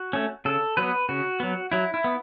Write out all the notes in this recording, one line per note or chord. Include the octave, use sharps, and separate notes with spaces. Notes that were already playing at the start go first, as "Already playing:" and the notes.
Already playing: F#4
A3 C#4
C#3 A4
F#3 B3 B4
C#3 F#4
F#3 B3
F#3 E4
E4
B3